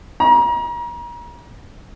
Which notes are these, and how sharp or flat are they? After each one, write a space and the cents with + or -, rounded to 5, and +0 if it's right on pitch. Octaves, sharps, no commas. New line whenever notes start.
A#5 +35